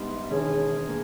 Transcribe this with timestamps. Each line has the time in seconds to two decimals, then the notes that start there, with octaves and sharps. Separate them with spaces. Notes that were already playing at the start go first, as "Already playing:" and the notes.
Already playing: A#1 G#2 G3 B3 D#4
0.29 E1 D#2 D#3 G#3 C#4 G#4
0.88 A#3